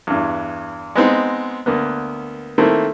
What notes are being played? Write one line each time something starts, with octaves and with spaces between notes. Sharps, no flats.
E2 G2
G#3 B3 C4 D#4
D2 A#3 B3
D#3 A3 A#3 C4 E4